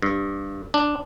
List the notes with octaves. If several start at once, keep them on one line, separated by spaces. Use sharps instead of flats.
G2
D4